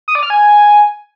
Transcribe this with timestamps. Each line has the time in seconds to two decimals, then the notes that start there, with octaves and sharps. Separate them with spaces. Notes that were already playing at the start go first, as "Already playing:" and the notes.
0.08 D#6
0.15 D5
0.23 F6
0.30 G#5